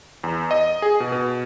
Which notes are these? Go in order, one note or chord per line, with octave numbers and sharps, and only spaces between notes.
E2
D#5
G#4
B2
B2